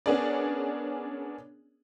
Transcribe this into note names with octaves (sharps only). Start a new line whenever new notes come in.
B3 C#4 D4 G#4 A#4 D5